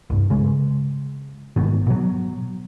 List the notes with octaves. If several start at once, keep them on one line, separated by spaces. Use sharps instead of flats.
C2 G2
C#3 G#3
A1 G#2 B2 D#3
B2 F#3